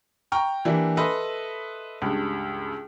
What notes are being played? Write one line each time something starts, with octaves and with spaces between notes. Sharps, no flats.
G5 A#5 C#6 F6
E3 A#3 D4 E4 G4
A4 B4 D#5 E5 B5 C6
C#2 G2